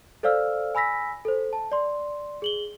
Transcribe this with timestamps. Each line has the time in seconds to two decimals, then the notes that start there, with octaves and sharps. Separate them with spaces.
0.23 A4 C5 D5 F5 E6 F6
0.75 G#5 B5 E6 A#6 B6
1.25 A4 C5
1.53 A5
1.72 D5 C6
2.42 G#4 F#7 G7